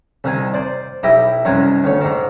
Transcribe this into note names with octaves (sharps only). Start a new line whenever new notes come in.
C2 D#3 G#5
C5 D5
B1 E4 G4 D#5 E5
C2 F#2 D#3 G#5 C6
D2 C#5
G#2 D#3